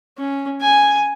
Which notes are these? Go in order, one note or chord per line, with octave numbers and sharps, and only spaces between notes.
C#4
G#5